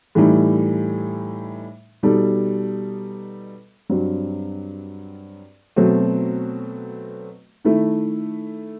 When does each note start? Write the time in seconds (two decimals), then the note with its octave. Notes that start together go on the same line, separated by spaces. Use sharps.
0.15 A2 E3 G3 D#4
2.03 B2 G3 D#4 A4
3.89 G2 F#3 C4
5.76 B2 F#3 A3 C4
7.65 D#3 A3 E4